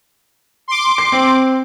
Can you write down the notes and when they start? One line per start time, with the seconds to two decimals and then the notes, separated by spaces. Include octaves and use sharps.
0.68 C6 D6
0.98 C7
1.12 C4